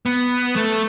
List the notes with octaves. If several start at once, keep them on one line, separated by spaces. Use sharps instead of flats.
B3
A3